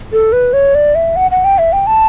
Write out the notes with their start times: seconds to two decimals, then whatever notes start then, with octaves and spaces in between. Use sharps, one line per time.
0.13 A4
0.33 B4
0.53 C#5
0.75 D5
0.95 E5
1.16 F#5
1.31 F#5
1.45 G5
1.58 E5
1.73 G5
1.87 A5